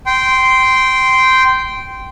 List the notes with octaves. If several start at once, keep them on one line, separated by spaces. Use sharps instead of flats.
G5 C6